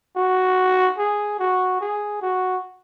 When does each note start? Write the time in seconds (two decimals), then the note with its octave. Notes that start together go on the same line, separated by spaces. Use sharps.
0.16 F#4
0.98 G#4
1.39 F#4
1.81 G#4
2.22 F#4